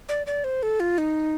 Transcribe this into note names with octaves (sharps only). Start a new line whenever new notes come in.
D5
D5
C5
A4
F4
D#4